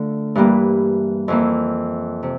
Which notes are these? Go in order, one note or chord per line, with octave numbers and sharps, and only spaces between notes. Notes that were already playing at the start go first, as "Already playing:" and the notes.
Already playing: D3 A3 D4 F4
G2 E3 G3 A#3
F2 E3 A#3
C3